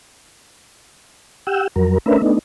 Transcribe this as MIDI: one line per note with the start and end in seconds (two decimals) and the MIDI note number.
1.47 1.67 67
1.47 1.67 78
1.47 1.67 79
1.47 1.67 88
1.76 1.98 41
1.76 1.98 54
1.76 1.98 70
2.06 2.21 57
2.06 2.21 61
2.06 2.21 62
2.06 2.21 70
2.06 2.21 71
2.06 2.21 76
2.22 2.39 57
2.22 2.39 59
2.22 2.39 62
2.22 2.39 63